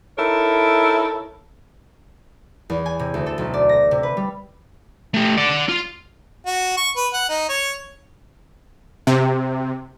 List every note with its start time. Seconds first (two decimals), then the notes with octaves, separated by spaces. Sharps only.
0.18 D#4 E4 A4 A#4 C#5
2.70 E2
2.86 G#5
2.99 C3
3.14 D2
3.26 A4
3.38 B1
3.54 D5
3.69 A#6
3.91 C3
4.03 B4
4.17 G3
5.14 A3 G4
5.37 D5 F#5
5.69 F4
6.46 F#4
6.77 C#6
6.97 B4
7.13 F#5
7.29 D#4
7.49 C#5
9.07 C3